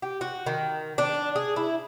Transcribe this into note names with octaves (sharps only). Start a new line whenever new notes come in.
G4
F#4
D#3
D4
G#4
E4